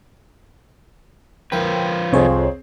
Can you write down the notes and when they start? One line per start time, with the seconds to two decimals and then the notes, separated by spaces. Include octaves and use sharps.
1.52 F3 A#4 B4 G5
2.13 C2 F2 C4 G#4 C#5